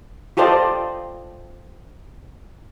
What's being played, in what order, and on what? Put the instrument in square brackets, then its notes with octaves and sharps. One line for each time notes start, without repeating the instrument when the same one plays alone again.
[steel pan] F4 G4 A4 C5 D5 D#5